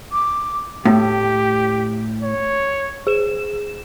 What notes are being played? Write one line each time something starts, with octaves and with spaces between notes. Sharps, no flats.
D6
A2 G4
C#5
G#4 E7